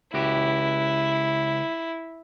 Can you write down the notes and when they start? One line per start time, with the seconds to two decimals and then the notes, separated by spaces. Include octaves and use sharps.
0.14 C#2 E4 F#4 G4